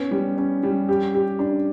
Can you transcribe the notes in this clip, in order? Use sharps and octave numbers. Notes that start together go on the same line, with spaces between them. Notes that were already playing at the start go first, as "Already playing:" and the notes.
Already playing: B3 C#4
G3
C#4
G3
G4
G4
D4